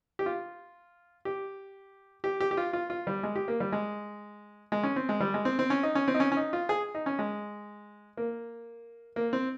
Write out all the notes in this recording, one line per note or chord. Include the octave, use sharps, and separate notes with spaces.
G4
F4
G4
G4
G4
G4
F4
F4
F4
G3
G#3
G4
A#3
G3
G#3
G#3
C#4
C4
G#3
G3
G#3
C4
C4
C#4
D#4
C#4
C4
D#4
C#4
C#4
D#4
F4
G#4
D#4
C#4
G#3
A#3
A#3
C4